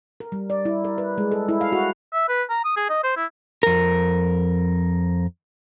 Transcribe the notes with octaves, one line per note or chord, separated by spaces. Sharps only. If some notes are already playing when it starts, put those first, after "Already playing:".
A#4
G3
D5
E4
A#4
B4
G#3
A4
E4
F5
F#4
E5
B4
A#5
D#6
G#4
D#5
C5
E4
F2 A#4